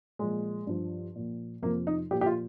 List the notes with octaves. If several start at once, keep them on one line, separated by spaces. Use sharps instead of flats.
A#2 F3 G#3
G2 F3
A#2 F3
F2 C3 F3 A#3
D#4
A#2 F3 G4
G4
F4